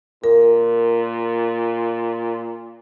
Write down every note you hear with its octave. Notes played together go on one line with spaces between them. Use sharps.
A#2 A#4